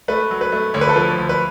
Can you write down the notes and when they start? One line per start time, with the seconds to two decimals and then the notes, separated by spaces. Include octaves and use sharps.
0.08 A3 B4
0.31 F#3
0.41 B4
0.52 A3
0.74 D2 C#5
0.81 B4
0.89 A4
0.96 F3 B4
1.18 D2
1.29 B4